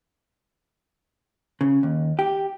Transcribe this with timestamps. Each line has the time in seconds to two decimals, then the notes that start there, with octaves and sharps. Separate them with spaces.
1.61 C#3
1.83 D#2
2.19 G4